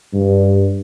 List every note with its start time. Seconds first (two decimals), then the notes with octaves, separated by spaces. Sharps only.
0.14 G2